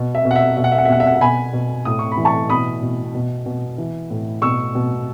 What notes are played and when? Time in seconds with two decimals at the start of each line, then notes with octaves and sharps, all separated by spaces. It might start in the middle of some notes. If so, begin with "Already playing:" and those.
Already playing: B2
0.15 E5
0.25 B2
0.31 F#5
0.36 E5
0.57 B2 E5
0.64 F#5
0.72 E5
0.78 F#5
0.85 E5
0.89 B2 F#5
1.00 E5
1.07 F#5
1.14 E5
1.21 B2 G#5 B5
1.53 B2
1.85 A2 D#6
1.99 C#6
2.12 B5
2.17 E3
2.25 A5 C#6
2.50 B2 B5 D#6
2.82 B2
3.14 B2
3.46 B2
3.78 E3
4.10 A2
4.42 B2 C#6 E6
4.75 B2